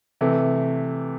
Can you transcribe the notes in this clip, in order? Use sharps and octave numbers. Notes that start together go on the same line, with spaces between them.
C3 E3 A3